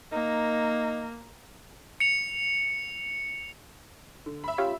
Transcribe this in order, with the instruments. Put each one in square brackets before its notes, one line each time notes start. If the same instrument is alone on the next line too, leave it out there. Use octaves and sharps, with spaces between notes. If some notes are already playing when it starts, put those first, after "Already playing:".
[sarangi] A#3 [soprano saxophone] D#4
[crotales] C#7 F7
[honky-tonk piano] D3
E5 B5
[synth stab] C#4 F4 G4